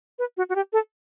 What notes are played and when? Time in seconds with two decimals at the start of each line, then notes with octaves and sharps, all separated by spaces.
0.19 B4
0.37 F#4
0.49 F#4
0.55 G4
0.73 A4